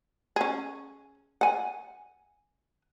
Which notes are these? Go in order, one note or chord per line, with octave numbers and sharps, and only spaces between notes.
C#4 G#4
F#5 G#5